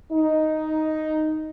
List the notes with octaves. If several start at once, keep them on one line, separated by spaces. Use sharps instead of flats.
D#4